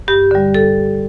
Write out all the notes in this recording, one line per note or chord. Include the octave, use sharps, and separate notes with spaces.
G2 G4
D3 G3
A4